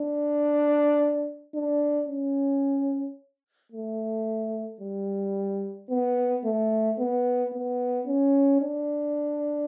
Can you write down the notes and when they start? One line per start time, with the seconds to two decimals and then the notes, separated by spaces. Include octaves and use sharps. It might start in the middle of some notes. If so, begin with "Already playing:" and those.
Already playing: D4
1.55 D4
2.09 C#4
3.72 A3
4.81 G3
5.89 B3
6.44 A3
6.99 B3
7.53 B3
8.07 C#4
8.61 D4